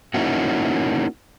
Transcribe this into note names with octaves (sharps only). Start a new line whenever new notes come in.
A#3 C#4 D#4 E4 F#4